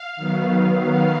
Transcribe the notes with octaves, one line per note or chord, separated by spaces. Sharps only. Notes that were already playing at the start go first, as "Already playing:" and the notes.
Already playing: F5
D#3 F#3 B3